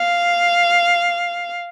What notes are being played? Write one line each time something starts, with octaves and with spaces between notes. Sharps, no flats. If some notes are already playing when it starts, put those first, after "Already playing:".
Already playing: F5